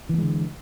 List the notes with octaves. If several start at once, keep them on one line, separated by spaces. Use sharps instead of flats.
D3 E3 G#3 B3